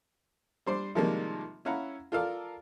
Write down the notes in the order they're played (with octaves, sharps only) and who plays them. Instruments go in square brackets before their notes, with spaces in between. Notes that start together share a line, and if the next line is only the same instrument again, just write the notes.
[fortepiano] G3 D4 C5 D5 C6
C3 D#3 F3 G3 G#3 A#3
C#4 E4 F5 F#5 A#5 B5
F4 A4 A#4 D5 F5